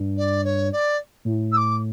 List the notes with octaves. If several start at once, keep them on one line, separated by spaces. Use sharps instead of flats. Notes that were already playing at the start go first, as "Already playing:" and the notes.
Already playing: G2
D5
C#5
D5
A2
E6
D6